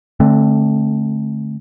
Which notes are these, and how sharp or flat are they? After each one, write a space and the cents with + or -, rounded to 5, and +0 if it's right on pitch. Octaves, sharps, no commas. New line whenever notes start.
D3 +0 A3 -20 C4 +25